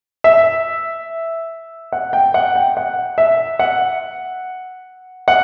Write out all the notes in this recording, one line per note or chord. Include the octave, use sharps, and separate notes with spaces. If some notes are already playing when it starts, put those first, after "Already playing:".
E5
F#5
G5
F#5
G5
F#5
E5
F#5
F#5